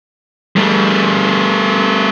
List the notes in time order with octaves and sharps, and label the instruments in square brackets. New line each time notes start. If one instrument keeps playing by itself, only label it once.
[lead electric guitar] G3 A3